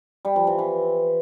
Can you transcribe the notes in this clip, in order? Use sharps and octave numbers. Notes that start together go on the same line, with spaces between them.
G3
F3
E3
E3